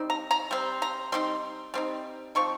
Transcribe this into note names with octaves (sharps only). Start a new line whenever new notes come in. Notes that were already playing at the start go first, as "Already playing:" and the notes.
Already playing: G3 C4 D#4
A#5
A#5
G3 C4
A#5
G3 C4 D#4 C6
G3 C4 D#4
F3 C4 D#4 C#6